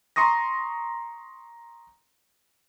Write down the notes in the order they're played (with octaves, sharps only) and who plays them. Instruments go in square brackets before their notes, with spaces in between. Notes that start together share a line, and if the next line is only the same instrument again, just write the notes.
[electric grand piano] A#5 C6 C#6 D#6 A#6